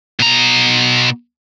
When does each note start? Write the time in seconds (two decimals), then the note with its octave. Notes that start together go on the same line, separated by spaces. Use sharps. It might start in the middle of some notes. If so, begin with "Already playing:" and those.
0.20 B2 A#5